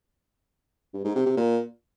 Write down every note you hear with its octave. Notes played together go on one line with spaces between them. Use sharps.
G2
G#2
C3
C3
A#2